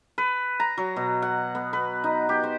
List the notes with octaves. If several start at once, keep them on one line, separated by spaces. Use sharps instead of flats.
B4
A#5
F#3
B2
F#5
B3
B4
D#4
G4
C5